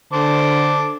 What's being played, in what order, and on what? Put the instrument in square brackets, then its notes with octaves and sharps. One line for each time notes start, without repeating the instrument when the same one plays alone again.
[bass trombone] D3 [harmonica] C5 A5 D6